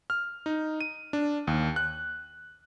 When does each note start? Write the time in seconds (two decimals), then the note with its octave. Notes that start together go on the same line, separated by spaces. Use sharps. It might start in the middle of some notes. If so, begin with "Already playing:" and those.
0.10 F6
0.46 D#4
0.81 D#7
1.13 D4
1.47 D#2
1.76 F#6